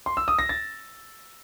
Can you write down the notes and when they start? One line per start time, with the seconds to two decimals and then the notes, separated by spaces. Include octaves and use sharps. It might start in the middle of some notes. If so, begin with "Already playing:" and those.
0.06 C6
0.17 E6
0.28 D#6
0.39 A#6
0.49 A6